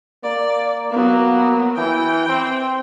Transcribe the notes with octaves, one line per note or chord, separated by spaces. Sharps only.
A#3 D5
F#3 A#3 B3
E3 G5
C4